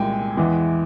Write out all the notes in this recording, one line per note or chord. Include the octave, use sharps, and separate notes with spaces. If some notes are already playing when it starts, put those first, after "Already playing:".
Already playing: C2 A#2 G#3 G5 G#5
E2 E3 G#3